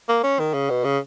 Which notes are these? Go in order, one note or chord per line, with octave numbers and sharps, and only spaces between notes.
A#3
C#4
D#3
C#3
B2
C#3